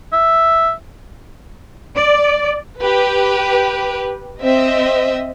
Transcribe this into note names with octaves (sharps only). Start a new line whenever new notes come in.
E5
D5
G4 B4
C4 D#5 E5